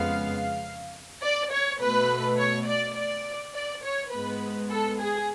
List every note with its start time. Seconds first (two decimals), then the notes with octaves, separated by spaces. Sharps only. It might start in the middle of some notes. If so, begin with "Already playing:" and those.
Already playing: F2 C#3 G#3 B3 F5
1.22 D5
1.51 C#5
1.80 B2 A3 B4
2.38 C#5
2.67 D5
2.96 D5
3.55 D5
3.84 C#5
4.12 G#2 G#3 B3 B4
4.71 A4
5.00 G#4